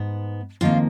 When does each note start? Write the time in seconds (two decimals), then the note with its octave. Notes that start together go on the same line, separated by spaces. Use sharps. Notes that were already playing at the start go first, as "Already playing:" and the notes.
Already playing: G#2 B3
0.61 F2 D#3 A#3 F4 F5